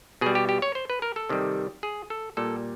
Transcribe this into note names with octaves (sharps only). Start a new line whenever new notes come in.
B2 G3 G#4
G4
G4
C#5
C5
B4
A#4
A4
C3 D#3 G3
G#4
A4
A#2 G3 A4